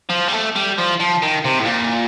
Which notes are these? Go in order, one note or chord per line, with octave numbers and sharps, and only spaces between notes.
F3
G3
A3
G3
F3
F3
D#3
C3
A2
A#2